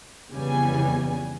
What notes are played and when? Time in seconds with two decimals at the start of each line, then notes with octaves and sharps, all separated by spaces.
0.31 F2 C#3 E3 G3 B3 G#5